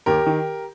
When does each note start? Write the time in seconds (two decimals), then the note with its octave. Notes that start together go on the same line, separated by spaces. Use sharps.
0.06 D#2 G4 A#4
0.26 D#3